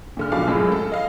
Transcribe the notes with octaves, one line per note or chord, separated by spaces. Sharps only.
A#2 D3 F6
B1 B2 D3 F3 F5 D6
C#2 F#2 A2 C#3 G#3
A4
D#5 F5